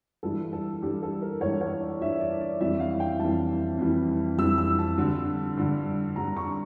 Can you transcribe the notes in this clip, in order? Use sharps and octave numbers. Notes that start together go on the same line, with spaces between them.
G2 E3 G3 A4
A4
G2 E3 G3 G4
A4
A#4
G2 E3 G3 C#5
C#5
D5
G2 E3 G3 E5
D5
D5
F2 E3 G3 E5
F5
G5
F2 E3 G3 A5
F2 E3 G3
F2 E3 G3 E6
E6
A5
G2 D3 G3
G2 D3 G3
G2 D3 G3 A#5
C#6